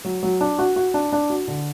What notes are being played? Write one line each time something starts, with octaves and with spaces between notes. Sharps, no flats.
F#3
F#3
D4
F#4
F#4
D4
D4
F#4
D3